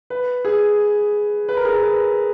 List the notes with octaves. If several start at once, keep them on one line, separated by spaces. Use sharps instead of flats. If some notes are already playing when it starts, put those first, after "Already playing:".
B4
G#4
B4
A#4
G#4
A#4
B4